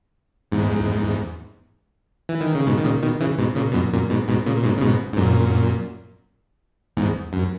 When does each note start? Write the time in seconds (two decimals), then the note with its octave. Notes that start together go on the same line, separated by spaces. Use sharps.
0.52 E2 G#2
2.29 E3
2.41 D#3
2.55 C#3
2.67 G#2 B2
2.78 D#3
2.84 A#2 C#3
3.03 B2 D#3
3.20 C#3 E3
3.38 G#2 B2
3.56 A#2 C#3
3.71 B2
3.74 F#2 A#2
3.92 F#2 A#2
4.10 G#2 B2
4.28 G#2 B2
4.46 A#2 C#3
4.56 A#2
4.63 G#2 B2
4.77 C#3
4.81 G#2 B2
5.14 G#2
5.17 F#2 A#2
6.97 E2 G#2
7.33 F#2